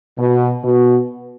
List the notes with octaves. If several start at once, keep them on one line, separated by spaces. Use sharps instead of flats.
B2
B2